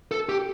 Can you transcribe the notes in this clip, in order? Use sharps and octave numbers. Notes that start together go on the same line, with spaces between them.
A4
G4